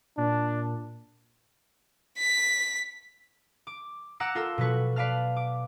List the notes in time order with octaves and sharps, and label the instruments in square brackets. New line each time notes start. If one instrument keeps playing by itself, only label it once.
[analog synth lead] A#2 [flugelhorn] D4
[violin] B6
[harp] D6
F#5 A#5 D6 E6 C#7
F4 A4 A#4 E6
B2 F#3 B4 C#6
B4 D5 F5 A5 F6
D6